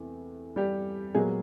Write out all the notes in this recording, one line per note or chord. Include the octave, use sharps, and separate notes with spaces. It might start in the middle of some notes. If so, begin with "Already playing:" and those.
Already playing: E2 C3 A3
G3 G4
A#2 F#3 G#3 B3 G#4